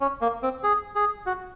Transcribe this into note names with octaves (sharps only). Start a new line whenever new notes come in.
C#4
A#3
C4
G#4
G#4
F#4